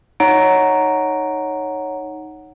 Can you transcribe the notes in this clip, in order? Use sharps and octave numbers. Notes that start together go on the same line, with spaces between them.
D#4 C#5 F#5 A#5 D7